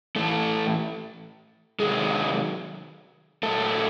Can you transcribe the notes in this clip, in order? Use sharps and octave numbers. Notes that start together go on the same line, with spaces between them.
A2 E3 A3 A4
C3 D#3 F#3 G#3 G#4
A#2 F#3 A3 A4